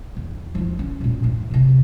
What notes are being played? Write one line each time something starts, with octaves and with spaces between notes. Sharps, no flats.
E2
F3 E4
C#4
E2 A#2
A2 E3
E2 C3